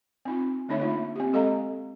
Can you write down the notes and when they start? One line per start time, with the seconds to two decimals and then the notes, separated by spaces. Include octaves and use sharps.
0.25 C4 D#4 F4
0.68 D3 A3 D4 D#4 C#5 E5
0.80 A3 A#3 D#4 F4
1.16 C4 G4
1.33 G#3 A4 D#5 F5 A#5